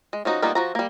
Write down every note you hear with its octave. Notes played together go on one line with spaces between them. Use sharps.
G#3
F3 C#4 D#4 F#4
G3 A#3 B3 D#4 F4
F3 F#4 A#5
G3 A#3